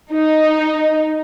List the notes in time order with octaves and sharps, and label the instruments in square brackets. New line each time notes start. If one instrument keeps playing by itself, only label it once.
[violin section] D#4